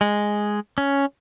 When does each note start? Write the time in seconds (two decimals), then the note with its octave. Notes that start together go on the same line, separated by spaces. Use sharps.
0.01 G#3
0.78 C#4